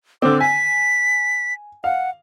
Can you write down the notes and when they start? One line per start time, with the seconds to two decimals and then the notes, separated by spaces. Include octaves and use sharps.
0.22 D3 C4 D6
0.40 G#5 B6
1.84 F5 F#5